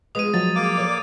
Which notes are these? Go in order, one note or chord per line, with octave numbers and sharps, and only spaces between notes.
F3 G#3 B3 D#6 D#7
F3 F#3 G#3 A6
A#3 D6
A4 C#5 D5